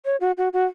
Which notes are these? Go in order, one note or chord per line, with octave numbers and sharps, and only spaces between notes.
C#5
F#4
F#4
F#4